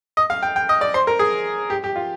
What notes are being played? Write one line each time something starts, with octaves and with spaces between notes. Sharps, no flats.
D#5
F5
G5
G5
D#5
D5
C5
A#4
G#4
G4
G4
F4